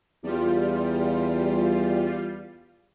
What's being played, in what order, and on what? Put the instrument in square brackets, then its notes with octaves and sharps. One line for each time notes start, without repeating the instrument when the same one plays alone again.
[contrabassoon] E2 [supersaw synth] G3 F4